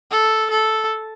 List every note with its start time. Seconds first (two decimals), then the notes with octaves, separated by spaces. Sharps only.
0.11 A4
0.51 A4